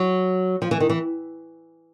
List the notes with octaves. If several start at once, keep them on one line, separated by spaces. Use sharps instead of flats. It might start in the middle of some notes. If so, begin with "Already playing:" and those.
Already playing: F#3
F3
E3
D#3
E3